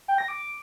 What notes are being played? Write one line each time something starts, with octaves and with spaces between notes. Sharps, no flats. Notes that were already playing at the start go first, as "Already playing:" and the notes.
G5
A#6
D6